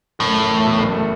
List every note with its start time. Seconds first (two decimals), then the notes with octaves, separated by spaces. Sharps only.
0.19 F#1 A2
0.34 A3
0.50 E2
0.65 B2
0.79 F#1
0.94 A3